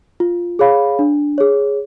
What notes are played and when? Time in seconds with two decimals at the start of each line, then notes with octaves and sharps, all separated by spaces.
0.20 F4
0.59 G#4 C#5 F5 B5
0.99 D4
1.38 G#4 C#5